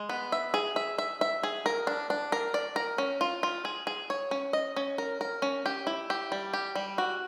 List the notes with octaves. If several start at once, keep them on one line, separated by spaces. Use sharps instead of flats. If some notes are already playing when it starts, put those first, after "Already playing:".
Already playing: G#3
B3
E5
G#4
E5
E5
E5
G#4
A#4
D4
D4
A#4
D5
A#4
C#4
F4
F4
G#4
G#4
C#5
C#4
D#5
C#4
A#4
A#4
C#4
G4
E4
G4
G3
G4
G3
F#4